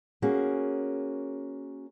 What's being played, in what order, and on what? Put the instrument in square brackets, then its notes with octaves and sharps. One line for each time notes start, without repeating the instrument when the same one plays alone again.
[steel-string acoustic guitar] A#3 C#4 F#4 G#4